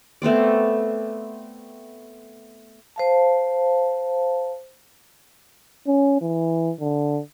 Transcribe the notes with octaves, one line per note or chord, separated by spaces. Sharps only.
A3 B3 C4 D5
C5 F5 A5
C#4
E3
D3